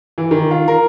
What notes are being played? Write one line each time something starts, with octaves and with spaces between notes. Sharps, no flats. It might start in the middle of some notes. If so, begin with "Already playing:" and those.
E3
D#3
F4
A#4